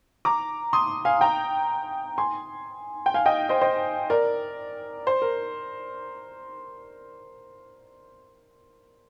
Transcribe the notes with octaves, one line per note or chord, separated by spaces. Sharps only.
A#5 D6
C6 D#6
F5 G#5
G5 A#5
G#5 C6
G5
F5 G#5
D#5 G5
C5 D#5
C5 D#5
A#4 D5
C5
A#4